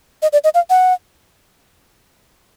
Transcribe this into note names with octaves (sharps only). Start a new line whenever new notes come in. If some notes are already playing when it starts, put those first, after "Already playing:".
D#5
D5
D#5
F5
F#5